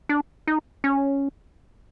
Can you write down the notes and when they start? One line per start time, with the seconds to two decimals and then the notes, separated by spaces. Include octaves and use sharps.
0.09 D4
0.47 D#4
0.84 C#4